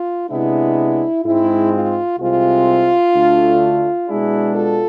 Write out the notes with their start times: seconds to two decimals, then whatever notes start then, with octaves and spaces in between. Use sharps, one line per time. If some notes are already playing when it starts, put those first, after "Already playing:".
Already playing: F4
0.29 C3 G#3 B3 D4 E4
1.23 G#2 G#3 C4 E4
1.71 F4
2.18 C2 C3 G#3 C4 F4
3.13 D2 D3 A3 D4
4.07 B2 G#3 D4 E4 G#4
4.55 F4 A4